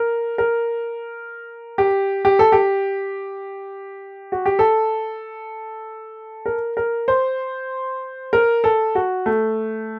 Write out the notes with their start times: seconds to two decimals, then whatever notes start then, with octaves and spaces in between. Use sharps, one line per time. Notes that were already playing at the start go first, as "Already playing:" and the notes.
Already playing: A#4
0.38 A#4
1.78 G4
2.25 G4
2.39 A4
2.52 G4
4.32 F#4
4.46 G4
4.59 A4
6.46 A#4
6.77 A#4
7.08 C5
8.33 A#4
8.64 A4
8.95 F#4
9.26 A3